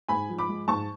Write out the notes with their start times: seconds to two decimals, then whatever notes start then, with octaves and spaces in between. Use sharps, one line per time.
0.08 G#2 G#5 B5
0.29 F3
0.39 B5 D6
0.49 G#3
0.68 G#2 A5 C#6